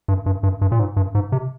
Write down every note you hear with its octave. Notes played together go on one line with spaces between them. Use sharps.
G2
G2
G2
G2
A#2
G#2
G2
G#2
C3